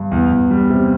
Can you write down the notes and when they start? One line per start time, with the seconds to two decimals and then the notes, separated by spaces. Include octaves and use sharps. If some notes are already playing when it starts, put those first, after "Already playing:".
Already playing: G2
0.11 E2
0.31 E2
0.51 G3
0.70 C3